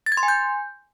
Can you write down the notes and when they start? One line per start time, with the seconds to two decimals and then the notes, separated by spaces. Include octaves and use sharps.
0.06 A6
0.12 G#6
0.17 C6
0.23 G#5
0.28 G6